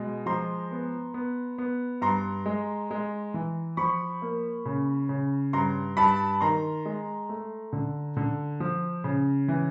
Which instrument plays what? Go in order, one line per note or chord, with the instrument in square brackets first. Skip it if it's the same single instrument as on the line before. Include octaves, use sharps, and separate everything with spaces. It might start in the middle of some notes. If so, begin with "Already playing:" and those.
Already playing: [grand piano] B2 G#3
F3 A#5 C6
B3
B3
B3
G2 A#5 C6
G#3
G#3
E3
F3 B5 C#6
A#3
C#3
C#3
G2 A#5 C6
G2 A5 B5
D#3 A#5 C6
G#3
A3
D3
D3
F3
C#3
E3